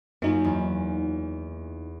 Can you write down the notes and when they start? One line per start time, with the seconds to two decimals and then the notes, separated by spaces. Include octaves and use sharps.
0.22 F#2 A#3 D#4 F4
0.44 E2